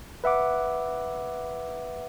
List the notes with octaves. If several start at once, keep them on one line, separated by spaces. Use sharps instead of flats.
B4 E5 F#5 D6